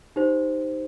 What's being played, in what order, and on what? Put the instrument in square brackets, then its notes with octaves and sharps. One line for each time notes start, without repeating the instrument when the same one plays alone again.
[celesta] D#4 G4 C5